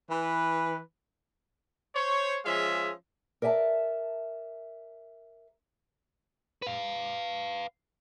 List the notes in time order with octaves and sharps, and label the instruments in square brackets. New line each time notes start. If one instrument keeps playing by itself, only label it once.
[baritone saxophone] E3 [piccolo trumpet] B4
[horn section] C5 C#5
F3 G#3 C#4 F4 G#4 E5
[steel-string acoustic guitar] A#4 D5 E5 G#5 A5
[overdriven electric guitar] B4 F5